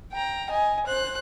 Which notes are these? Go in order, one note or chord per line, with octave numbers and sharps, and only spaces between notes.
G5 A#5
D#5 G#5
C5 F#6